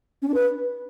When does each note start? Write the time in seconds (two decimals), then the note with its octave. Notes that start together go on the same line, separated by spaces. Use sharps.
0.22 C#4
0.28 D4
0.34 B4